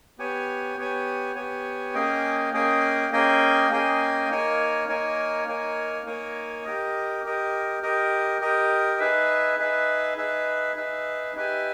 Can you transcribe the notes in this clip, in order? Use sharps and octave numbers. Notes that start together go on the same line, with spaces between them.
B3 G4 C#5 G#5
B3 G4 C#5 G#5
B3 G4 C#5 G#5
A#3 C#4 G#4 D#5 G5
A#3 C#4 G#4 D#5 G5
A#3 C#4 G#4 D#5 G5
A#3 C#4 G#4 D#5 G5
A#3 D#4 A#4 C#5 G#5
A#3 D#4 A#4 C#5 G#5
A#3 D#4 A#4 C#5 G#5
A#3 D#4 A#4 C#5 G#5
G4 A#4 D#5
G4 A#4 D#5
G4 A#4 D#5
G4 A#4 D#5
D#4 G#4 B4 E5
D#4 G#4 B4 E5
D#4 G#4 B4 E5
D#4 G#4 B4 E5
D#4 G4 B4 E5 G#5